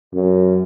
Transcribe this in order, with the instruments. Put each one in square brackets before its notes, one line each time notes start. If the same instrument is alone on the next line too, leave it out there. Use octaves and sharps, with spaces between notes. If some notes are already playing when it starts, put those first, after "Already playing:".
[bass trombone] F#2